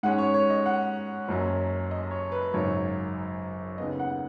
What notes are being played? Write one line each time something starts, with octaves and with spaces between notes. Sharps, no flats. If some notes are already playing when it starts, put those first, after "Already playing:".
G#2 G#3 C#4 F#5
C#5
C#5
D#5
F#5
F#1 F#2 F#3 C#4
D#5
C#5
B4
G#1 F#2 C#3 F#3 C#5
D#2 C#3 B3 D#5
F#5